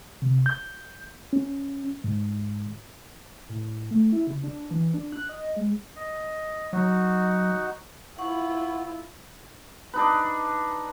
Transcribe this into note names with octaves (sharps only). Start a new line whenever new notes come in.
C3
G6
C#4
G#2
A2
A3
E4
C#3
D4
E3
D4
F#6
D#5
G#3
D#5
F#3 D#4 F#4
E4 F4 F#5 C#6
D4 D#4 B4